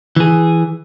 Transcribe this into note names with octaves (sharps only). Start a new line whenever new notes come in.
E3 G#4